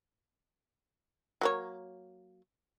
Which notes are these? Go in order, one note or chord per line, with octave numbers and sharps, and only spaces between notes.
F#3 A#3 C#5